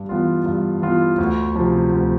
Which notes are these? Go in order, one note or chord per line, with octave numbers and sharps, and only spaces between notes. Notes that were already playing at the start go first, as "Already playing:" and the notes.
Already playing: G2
E3 B3 F4
G2
E3 B3 F4
D2
C3 F3
D2